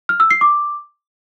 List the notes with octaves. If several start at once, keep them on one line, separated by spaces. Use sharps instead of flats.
F6
E6
C7
D6